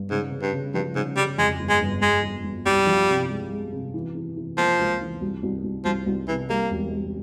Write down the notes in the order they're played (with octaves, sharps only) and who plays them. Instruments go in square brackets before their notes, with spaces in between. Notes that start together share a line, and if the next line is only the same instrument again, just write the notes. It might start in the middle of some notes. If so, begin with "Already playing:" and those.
Already playing: [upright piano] G2
[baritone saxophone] G#2 [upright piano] C#3
[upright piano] C#3
[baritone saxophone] G2
[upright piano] C#3
[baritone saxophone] G2 [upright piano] F3
[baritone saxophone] G#2 [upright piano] C#3
[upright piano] C#3 [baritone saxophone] G3
[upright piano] F2 [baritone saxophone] G#3
[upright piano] G1
[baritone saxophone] G#3
[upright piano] G1
[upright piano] G1 [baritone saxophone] G#3
[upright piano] G1
G1
[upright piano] C2 [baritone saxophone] G3
[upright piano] F3
C3
G#3
G#3
C3
E3
E3
E3
[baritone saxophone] F3 [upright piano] A#3
[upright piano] C#2
E3
C2
C2
C2
[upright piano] C2 [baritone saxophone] F3
[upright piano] C2
[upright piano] C3 [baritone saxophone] E3
[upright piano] G3 [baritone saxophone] A#3
[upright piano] E1
G3